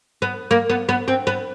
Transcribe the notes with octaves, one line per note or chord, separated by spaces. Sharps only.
B3
A#3
B3
B3
C4
B3